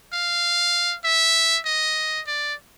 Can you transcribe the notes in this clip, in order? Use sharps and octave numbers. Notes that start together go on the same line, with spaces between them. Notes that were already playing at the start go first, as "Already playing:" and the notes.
F5
E5
D#5
D5